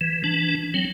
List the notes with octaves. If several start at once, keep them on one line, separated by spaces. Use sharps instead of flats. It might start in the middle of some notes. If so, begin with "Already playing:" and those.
E3
E3 D4
F#3 C4